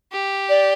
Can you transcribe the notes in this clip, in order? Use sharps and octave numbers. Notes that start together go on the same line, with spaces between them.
G4
D5